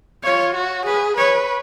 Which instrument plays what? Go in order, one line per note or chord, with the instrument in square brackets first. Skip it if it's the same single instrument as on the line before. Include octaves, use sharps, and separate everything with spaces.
[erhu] F4 [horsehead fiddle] C#5
[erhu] F#4
[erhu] G#4 [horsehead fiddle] B4
[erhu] B4 [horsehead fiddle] C#5